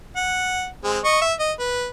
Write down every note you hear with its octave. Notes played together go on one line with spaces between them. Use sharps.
F#5
G#3 C4
D#5 C#6
E5
D#5
B4